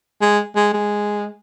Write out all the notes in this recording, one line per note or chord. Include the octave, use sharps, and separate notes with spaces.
G#3
G#3
G#3